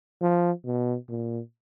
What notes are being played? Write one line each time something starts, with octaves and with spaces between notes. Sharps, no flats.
F3
B2
A#2